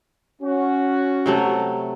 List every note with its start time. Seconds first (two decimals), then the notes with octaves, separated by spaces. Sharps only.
0.42 C#4 F#4
1.26 C3 F#3 A3